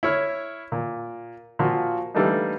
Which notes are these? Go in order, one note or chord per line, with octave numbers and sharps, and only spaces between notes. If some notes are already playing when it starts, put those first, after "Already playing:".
E4 C#5 F6
A#2
A#2 F3 F#4
E3 G3 A3 A#3 D4 D#4